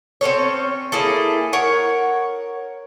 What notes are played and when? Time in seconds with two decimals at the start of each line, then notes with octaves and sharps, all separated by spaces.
0.21 C4 C#4 A4 C#5
0.92 A#3 E4 G#4 A4
1.53 A#4 C#5 F#5